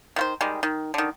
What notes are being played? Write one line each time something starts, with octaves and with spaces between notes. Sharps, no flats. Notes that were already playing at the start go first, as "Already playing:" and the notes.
D#3 F4 C5
D#3 G3 G#3
D#3
D3 D#3